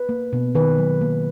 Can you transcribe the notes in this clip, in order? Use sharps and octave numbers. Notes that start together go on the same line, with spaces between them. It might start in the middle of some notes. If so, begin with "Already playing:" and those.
Already playing: B4
A#3
B2
D#3 B4
F#3
A#3